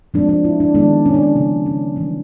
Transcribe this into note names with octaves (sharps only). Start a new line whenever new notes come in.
F3 G#3 C4 D4
D4
E4
D4
D#3 G#3 B3 D4
C#4
D4
C#4
C#3 F3 A#3 D4
C#4
E3 G3 C4 D4